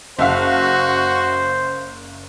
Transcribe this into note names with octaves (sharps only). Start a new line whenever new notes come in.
F#1 F#4 C5 E5 F5